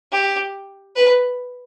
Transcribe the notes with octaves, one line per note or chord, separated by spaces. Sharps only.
G4
B4